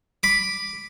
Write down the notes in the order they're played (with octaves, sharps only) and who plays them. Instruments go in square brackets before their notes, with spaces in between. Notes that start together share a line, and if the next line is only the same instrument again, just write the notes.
[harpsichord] B5 D6